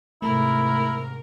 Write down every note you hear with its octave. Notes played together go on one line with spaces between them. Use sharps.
G#2 C3 A3 E4 A#4